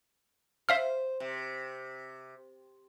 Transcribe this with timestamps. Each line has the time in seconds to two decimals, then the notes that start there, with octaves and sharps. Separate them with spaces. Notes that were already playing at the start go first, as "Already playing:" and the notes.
0.69 C5 E5 F5 F6
1.20 C3